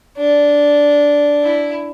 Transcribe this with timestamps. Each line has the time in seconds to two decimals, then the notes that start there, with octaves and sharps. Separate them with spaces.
0.18 D4
1.44 E4